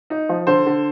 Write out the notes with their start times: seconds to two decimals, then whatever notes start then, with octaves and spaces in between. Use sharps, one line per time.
0.10 D#4
0.29 F3
0.47 D3 C5
0.66 D3